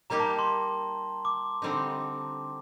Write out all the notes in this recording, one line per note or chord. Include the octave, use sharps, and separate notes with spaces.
G3 A#3 D#4 G4 A#5
A5
C6
D6
D3 G3 C4 D#4
D6